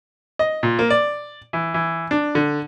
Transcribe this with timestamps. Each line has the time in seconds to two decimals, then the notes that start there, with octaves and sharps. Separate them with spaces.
0.39 D#5
0.63 A#2
0.79 A#3
0.90 D5
1.53 E3
1.74 E3
2.11 D4
2.35 D3